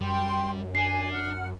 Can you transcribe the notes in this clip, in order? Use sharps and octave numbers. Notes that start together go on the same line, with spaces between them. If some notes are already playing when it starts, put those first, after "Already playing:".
F#2 G3 G5 C6
D4 G#5 C7
F#5 F6